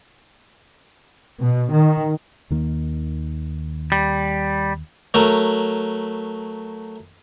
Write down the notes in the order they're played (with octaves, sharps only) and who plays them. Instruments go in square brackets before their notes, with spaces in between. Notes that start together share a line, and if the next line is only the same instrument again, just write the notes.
[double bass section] B2
D#3
[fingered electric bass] D#2 D#3 A#3
[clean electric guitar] G3
[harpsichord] F#3 A3 A#4